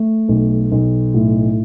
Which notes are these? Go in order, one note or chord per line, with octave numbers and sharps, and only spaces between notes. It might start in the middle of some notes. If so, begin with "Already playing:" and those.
Already playing: A3
B1
B1
A2